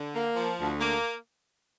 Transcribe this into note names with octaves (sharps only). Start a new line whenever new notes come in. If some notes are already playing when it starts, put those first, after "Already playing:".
Already playing: D3
A#3
F3
D2
A#3